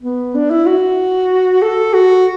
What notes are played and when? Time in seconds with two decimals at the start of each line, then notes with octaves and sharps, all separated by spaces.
0.03 B3
0.35 D4
0.50 E4
0.66 F#4
1.62 A4
1.94 F#4